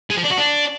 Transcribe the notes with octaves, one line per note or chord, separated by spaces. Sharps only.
G#3
F3
D4
F#4
D4